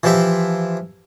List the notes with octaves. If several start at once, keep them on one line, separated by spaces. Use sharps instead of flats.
E3 F3 E4 G4 E5